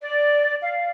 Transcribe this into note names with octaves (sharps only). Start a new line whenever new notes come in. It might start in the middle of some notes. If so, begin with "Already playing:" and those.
D5
F5